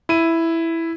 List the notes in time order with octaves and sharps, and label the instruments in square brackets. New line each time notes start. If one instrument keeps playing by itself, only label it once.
[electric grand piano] E4 D#7